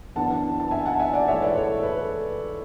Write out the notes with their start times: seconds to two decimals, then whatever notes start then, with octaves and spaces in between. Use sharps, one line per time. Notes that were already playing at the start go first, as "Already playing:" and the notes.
0.15 F#2 E3 B3 D4 F#5 A5
0.60 A5
0.71 E5 G#5
0.85 F#5 A5
0.99 E5 G#5
1.13 D5 F#5
1.28 G#2 E3 A3 E4 C#5 E5
1.42 B4 D5
1.56 A4 C#5
1.79 A4
1.83 B4